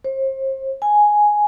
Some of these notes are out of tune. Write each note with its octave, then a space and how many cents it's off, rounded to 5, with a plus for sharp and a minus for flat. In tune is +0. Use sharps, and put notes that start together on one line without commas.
C5 +35
G#5 +5